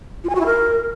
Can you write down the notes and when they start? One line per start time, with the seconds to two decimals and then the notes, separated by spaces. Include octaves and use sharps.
0.24 F4
0.30 G#5
0.35 F#4
0.41 E4
0.46 A#4